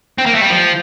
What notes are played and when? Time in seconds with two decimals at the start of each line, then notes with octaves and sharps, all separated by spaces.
0.18 C4
0.26 A#3
0.35 A3
0.42 G3
0.50 F3